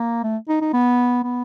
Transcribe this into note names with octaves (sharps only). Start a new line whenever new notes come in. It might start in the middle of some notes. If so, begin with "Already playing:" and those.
Already playing: A#3
A3
D#4
D#4
B3
B3